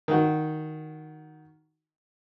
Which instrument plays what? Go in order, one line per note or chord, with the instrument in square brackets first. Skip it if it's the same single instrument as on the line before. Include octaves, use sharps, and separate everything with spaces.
[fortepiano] D#3 F#4